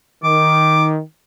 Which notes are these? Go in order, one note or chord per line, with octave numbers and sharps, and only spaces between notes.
D#3 D6